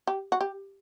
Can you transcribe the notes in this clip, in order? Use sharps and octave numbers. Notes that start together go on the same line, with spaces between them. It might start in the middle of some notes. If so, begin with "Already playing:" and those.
G4
F#4
G4